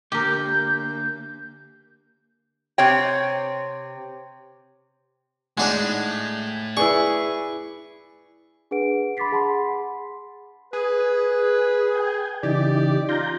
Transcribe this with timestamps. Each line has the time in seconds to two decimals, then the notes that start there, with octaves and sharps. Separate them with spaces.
0.12 D3 A#3 G4 A#4 G6
2.78 C3 C#5 G5
5.58 A2 G#3 D4 D#4 F#5
6.77 E4 G#4 B4 D5 C#6
8.71 D4 G#4 B4 F#5 D7
9.17 B5 C6 D6 A6 B6 C7
9.32 G#4 F#5 A5 B5 C6
10.73 G#4 B4
11.95 G5 G#5
12.43 C#3 E3 D#4 G4 D5
13.09 F4 A#5 G6